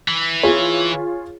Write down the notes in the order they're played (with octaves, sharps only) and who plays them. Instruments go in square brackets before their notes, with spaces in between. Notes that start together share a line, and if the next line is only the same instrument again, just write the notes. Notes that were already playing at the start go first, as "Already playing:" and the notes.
[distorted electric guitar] E3
[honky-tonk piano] F4 G#4 C#5